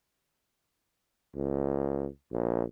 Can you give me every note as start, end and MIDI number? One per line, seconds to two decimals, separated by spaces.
1.35 2.08 37
2.32 2.63 34